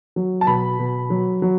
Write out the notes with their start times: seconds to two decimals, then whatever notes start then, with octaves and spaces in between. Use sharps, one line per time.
0.16 F#3
0.41 A5
0.47 B2 B5
0.79 B2
1.10 F#3
1.42 F#3